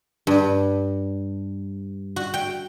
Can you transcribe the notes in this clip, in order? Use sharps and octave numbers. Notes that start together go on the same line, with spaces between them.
G2
F#4
G5